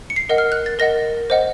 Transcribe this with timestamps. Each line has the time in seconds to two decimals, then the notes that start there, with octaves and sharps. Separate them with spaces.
0.10 C#7
0.16 C7
0.29 A#4 D#5 F#5
0.38 F6
0.52 F#6
0.66 A6
0.79 A#4 D#5 F#5 A#6
1.30 C5 D#5 F#5